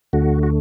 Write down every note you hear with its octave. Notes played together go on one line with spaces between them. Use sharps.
D2 D3 A3 F#4
F#4